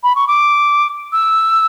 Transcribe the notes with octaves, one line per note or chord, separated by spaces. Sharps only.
B5
C#6
D6
E6